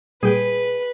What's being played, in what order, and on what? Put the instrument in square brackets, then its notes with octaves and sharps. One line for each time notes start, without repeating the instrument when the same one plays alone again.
[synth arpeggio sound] A#2 G3 [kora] G#4 G5 [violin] B4